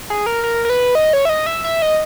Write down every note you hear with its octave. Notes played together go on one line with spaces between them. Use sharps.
G#4
A#4
A#4
A#4
B4
D#5
C#5
E5
D#5
E5
E5
D#5